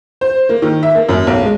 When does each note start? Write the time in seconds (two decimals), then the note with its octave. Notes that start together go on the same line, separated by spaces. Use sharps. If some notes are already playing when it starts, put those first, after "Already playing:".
0.21 C5
0.49 A#3
0.62 D#3
0.83 E5
0.95 A#3
1.09 F#2
1.27 B1
1.43 G#3